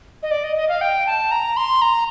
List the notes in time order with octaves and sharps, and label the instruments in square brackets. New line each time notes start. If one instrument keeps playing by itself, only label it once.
[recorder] D#5
D5
D#5
D#5
F5
G5
A5
A#5
C6
A#5